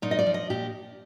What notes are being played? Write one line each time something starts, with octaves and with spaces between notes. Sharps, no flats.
A#2 D#4
D#5
D5
F3
D#5
A#2 G4